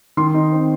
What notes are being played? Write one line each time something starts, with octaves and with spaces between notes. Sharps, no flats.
D#3 C6
D#4
C4